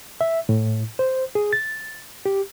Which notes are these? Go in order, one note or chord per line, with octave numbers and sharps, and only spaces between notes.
E5
A2
C5
G#4
A6
G4